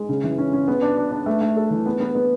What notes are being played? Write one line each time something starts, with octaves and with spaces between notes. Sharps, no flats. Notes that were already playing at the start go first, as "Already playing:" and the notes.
Already playing: G#3
C#3
E3
C#4
C#4
B3
D4
D4
D4
A3
A3
A4
E3
B3
B3
B3